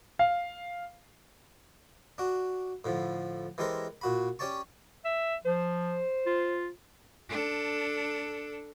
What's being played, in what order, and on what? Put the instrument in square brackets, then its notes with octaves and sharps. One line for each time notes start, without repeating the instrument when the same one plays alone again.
[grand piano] F5
[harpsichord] D4 F#4
A2 D3 F3
E3 G#3 G4 A4 A#4 C5
A#2 F#4 B5
C#4 G4 C#5 D5 A5 C#6
[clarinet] E5
[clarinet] F3 [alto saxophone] C5
[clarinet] F4
[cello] D4 A4